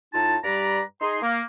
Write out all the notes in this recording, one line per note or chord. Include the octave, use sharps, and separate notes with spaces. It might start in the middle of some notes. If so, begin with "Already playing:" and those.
A2 D#4 F4 A5
G2 G3 G4 B4 D5 A#5
D#4 G#4 C6
A#3